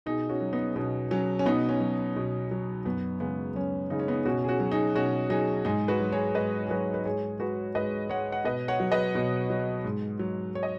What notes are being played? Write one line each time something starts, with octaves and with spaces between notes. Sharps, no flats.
B2 D#4 G#4
C#4 F#4
F#3
B3 D#4
B2 C#4
F#3 C#4
C#4
B2 B3 D#4
C#4
F#3
B2
F#3
F#2 B3
C#3 G#3 B3
F#2 C#4
C#3 G#3 D#4
C#4
B3 D#4
B2 C#4 F#4
G#4
C#4 F#4
F#3
D#4 G#4
B2 C#4 F#4
F#3 D#4 G#4
G#2 D#4 G#4
F#4 B4
F#3
G#4 C#5
G#2 B4 D#5
G#4
F#3 F#4 B4
B4
G#2 G#4 C#5
G#3 F#4 B4
G#2 B4 D#5
G#3 C#5 F#5
F#5
B2 B4 D#5
C#5 F#5
F#3
B4 D#5
B2
F#3
G#2
F#3
C#5
D#5